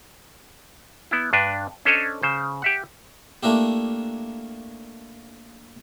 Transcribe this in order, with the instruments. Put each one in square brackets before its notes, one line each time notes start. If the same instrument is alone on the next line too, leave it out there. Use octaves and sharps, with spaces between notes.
[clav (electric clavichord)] B3 E4
G2 D4 B4
C#4 D4 A4 C5 C#5 D#5
C#3 C5
G4 E5 F#5
[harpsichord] A3 A#3 D4 E4 G4